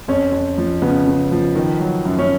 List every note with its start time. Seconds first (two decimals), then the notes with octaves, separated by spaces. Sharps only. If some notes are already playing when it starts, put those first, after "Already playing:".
0.08 F2 C#4
0.32 F2
0.58 F3
0.82 C#3 B3
1.07 C#3
1.32 F3
1.55 D#3
1.80 F#3
2.05 F#2
2.19 C#4